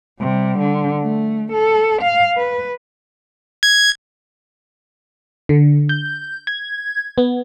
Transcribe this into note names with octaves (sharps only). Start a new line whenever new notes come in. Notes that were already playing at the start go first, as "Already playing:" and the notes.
C3 G3
D3
A3
A4
F5
B4
G#6
D3
G6
G#6
B3